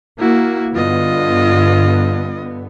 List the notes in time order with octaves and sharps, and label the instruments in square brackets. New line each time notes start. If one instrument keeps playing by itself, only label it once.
[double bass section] A#3 [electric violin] E4 F#4
[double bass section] G2 D3 B3 [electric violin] F4 D#5